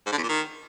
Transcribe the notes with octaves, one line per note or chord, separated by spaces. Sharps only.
G#2
D3
E2
A#2
D#3